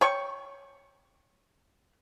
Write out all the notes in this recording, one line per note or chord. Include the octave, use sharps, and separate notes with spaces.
C#5 G5 C#6